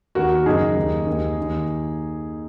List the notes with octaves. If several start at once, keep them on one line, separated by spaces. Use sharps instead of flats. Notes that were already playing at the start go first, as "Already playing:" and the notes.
D#2 D#3 F#4 A#4
F#2 C#3 D#4 G#4
D#2 D#3
D#3
D#2
D#2 D#3